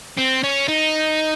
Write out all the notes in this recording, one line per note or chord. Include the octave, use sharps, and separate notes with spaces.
C4
C#4
D#4